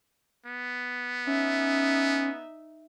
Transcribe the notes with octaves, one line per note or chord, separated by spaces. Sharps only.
B3
C#4 D#4 E5